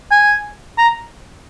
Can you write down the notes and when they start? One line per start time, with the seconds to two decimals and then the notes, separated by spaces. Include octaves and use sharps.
0.11 G#5
0.78 A#5